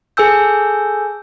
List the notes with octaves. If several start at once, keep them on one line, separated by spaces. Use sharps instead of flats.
G#4 A4 G#5 E6 G6